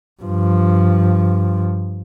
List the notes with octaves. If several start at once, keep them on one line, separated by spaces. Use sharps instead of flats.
G2 F3